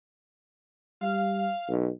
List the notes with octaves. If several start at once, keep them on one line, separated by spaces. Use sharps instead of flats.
G3 F5
B1